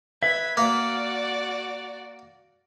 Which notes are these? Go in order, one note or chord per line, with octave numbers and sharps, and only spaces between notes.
B4 E5 G#6 B6
A#3 F#4 D5 F6